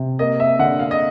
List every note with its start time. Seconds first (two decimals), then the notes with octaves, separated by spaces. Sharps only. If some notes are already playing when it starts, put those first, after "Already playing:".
Already playing: C3
0.19 A#3 D#5
0.40 E5
0.59 D3 F#5
0.79 F5
0.91 D#5